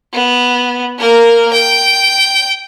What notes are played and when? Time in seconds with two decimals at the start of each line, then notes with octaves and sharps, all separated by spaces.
0.13 B3
0.98 A#3 A#4
1.53 G5